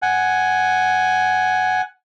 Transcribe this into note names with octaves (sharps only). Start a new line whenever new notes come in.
F#5 G#5